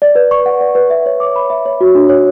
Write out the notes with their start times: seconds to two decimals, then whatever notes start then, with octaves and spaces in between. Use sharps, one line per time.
0.02 D5
0.15 B4
0.31 C#6
0.46 F#5
0.61 D5
0.75 B4
0.90 E5
1.06 C#5
1.20 D6
1.36 B5
1.50 E5
1.65 C#5
1.81 F#4
1.95 D4
2.09 C#5